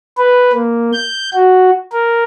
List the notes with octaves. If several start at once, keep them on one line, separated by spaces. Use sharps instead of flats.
B4
A#3
G6
F#4
A#4